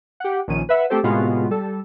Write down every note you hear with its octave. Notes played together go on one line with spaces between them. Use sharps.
G4 F#5
A#1 D#3 C#4 D#7
B4 E5 F#5
A3 C4 G4 A4 C5
A2 C3 G#3 B3 F4 F#4
G3 A4